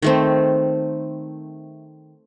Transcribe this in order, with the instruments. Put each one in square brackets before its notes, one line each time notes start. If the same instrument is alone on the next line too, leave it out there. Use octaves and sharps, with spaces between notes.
[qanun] D#3 A3 C4